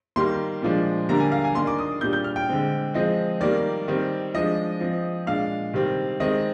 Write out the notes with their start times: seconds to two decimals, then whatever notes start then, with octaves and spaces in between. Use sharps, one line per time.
0.16 D#3 G3 A#3 C6
0.62 A#2 F3 G#3 D4
1.09 D3 G3 A#3 D4 A#5
1.20 G#5
1.32 F5
1.44 G#5
1.55 D#3 A#3 D4 C6
1.67 D6
1.78 D#6
2.01 A#2 G3 D4 G6
2.13 G6
2.24 F6
2.36 G5
2.49 D3 G#3 C4
2.94 F3 G#3 C4 D#5
3.41 D#3 G3 A#3 D5
3.88 D#3 G3 C4
4.34 F3 G#3 D4 D#5
4.80 F3 C4
5.27 A#2 G#3 D4 F5
5.73 C3 D#3 G3 C4
6.20 D#3 G#3 C4 D#5